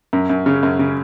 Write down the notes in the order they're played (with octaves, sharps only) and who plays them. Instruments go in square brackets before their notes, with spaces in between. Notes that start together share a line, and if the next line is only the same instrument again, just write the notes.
[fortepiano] F#2
F#2
C#3
F#2
C#3